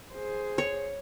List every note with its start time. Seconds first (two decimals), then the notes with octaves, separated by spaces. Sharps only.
0.13 G#4 C5
0.58 C#5